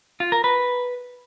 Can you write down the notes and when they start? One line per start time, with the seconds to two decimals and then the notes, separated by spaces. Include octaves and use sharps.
0.20 F4
0.32 A#4
0.44 B4